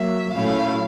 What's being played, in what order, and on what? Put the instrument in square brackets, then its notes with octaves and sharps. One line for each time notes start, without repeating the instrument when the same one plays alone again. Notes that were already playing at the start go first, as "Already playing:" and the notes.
Already playing: [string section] F#3 A#3 [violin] E5
[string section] A#2 F#3 A3 C#4 E4 [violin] F5